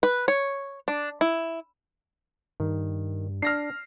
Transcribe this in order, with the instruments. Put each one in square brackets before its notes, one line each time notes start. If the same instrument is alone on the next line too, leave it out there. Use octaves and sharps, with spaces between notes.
[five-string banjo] B4
C#5
D4
E4
[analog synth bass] G2 [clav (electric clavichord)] D#3
[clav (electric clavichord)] D4 [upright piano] F6 A#6 C7